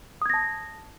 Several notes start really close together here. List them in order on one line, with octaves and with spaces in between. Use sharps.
D#6 G#6 A#6 A5